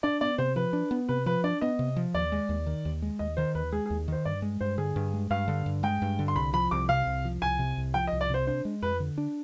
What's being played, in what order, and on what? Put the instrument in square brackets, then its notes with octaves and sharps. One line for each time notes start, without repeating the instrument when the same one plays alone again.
[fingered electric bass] D4 [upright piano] D5
[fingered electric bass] B3 [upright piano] D5
[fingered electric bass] C3 [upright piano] C5
[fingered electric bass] F3 [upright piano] B4
[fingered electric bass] D4
B3
[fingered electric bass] C3 [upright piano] B4
[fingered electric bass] F3 [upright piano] B4
[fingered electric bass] D4 [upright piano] D5
[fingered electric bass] B3 [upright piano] D#5
[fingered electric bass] C3
F3
[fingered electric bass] D#2 [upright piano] D5
[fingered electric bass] G#3
D#2
D#3
D#2
G#3
[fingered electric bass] D#2 [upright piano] D#5
[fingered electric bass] D#3 [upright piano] C5
[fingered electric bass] D#2 [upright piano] B4
[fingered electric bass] G#3 [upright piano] G#4
[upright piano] G#4
[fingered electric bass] D#2
[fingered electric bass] D#3 [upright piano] C5
[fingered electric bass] G2 [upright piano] D5
[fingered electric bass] G#3
[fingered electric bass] G2 [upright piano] C5
[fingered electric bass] D3 [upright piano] G#4
[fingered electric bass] G2
G#3
[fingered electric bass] G2 [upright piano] F5
[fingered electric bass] D3
G2
[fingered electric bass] G#3 [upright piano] G5
[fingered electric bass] G2
D3
[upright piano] C6
[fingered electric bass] C2 [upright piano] B5
[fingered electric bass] F3 [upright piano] B5
[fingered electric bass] C2 [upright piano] D6
[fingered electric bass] C3 [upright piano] F5
[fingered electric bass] C2
F3
[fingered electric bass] C2 [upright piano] G#5
[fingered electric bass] C3
C2
[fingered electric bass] F3 [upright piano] G5
[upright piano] D#5
[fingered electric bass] C2
[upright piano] D5
[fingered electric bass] C3 [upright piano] C5
[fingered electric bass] D4 [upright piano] C5
[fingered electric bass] G#3
[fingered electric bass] F2 [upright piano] B4
[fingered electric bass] D3
D4